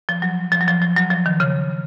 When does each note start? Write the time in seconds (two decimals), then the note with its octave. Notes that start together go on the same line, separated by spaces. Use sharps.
0.09 F3
0.22 F#3
0.52 F3
0.61 F#3
0.68 F3
0.82 F3
0.96 F#3
1.10 F3
1.26 D#3
1.40 C#3